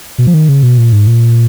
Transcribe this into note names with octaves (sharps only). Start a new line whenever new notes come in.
B2
F3
D#3
C#3
B2
A#2
G#2
A#2